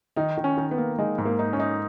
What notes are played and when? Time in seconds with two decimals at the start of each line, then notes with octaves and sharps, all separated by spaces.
0.16 D#3 D#4
0.37 D#3
0.44 C#4
0.57 D#3
0.71 B3
0.78 A#3
0.99 G#3 D#4
1.18 G#2
1.25 A#3
1.39 D#4
1.53 C#4
1.60 D#4